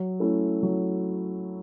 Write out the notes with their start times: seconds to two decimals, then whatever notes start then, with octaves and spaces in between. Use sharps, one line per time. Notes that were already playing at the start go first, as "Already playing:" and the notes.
Already playing: F#3
0.20 A3 C#4 E4
0.63 F#3